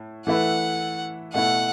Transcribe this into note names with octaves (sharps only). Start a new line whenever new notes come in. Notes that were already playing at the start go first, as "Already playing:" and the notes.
Already playing: A2
E3 A3 E4 B4 F#5
B2 A3 E4 F#5